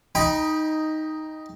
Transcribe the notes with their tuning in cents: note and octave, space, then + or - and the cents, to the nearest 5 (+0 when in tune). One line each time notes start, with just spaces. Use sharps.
D#4 +0 G5 +15 B5 -25